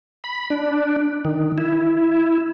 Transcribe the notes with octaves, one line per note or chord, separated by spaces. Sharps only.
B5
D4
D#3
E4